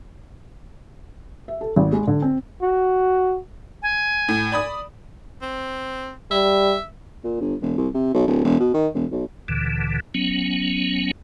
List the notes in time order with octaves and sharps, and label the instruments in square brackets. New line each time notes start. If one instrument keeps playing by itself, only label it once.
[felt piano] E5
A4
G#1
G#3
D3
C4
[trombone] F#4
[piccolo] G#5
[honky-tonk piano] A2
D5 B5 D#6
[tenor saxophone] C4
[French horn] G3 [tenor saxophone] E5
[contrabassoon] A#2
G1
E1
C2
C3
B1
D1
E1
B2
D#3
E1
B1
[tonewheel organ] D2 A#2 D3 E3
F#3 B3 C#4